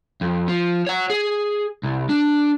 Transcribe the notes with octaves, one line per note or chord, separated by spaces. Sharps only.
F2
F3
C#5 F#5
G#4
C2
D4